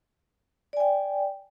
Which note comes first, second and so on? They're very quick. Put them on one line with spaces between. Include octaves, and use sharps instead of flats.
D5 G#5 G5